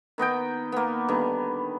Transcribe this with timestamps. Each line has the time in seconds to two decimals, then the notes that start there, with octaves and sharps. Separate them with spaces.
0.18 D#3 B3 D#5 G5
0.72 A#3 B3
1.08 D3 D#3 G3 B3